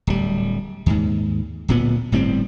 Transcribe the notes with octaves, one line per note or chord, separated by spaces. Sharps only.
D1 G3
D#2 G#2
D1 A#2 B3
G1 A2 G3 C4